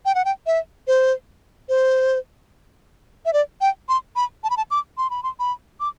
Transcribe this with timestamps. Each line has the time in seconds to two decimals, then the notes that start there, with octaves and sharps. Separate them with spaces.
0.05 G5
0.15 F#5
0.25 G5
0.46 E5
0.87 C5
1.69 C5
3.26 E5
3.33 D5
3.61 G5
3.89 C6
4.16 B5
4.44 A5
4.50 B5
4.57 A5
4.71 D6
4.98 C6
5.10 B5
5.23 C6
5.39 B5
5.80 D6